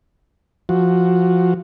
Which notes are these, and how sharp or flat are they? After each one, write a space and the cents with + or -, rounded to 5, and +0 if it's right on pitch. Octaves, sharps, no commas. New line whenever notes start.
F3 +0 F#4 +0